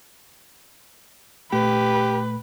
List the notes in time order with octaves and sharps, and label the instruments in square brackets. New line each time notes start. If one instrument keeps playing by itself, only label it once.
[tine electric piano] A#2 A3 [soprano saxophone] G4 [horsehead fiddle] B4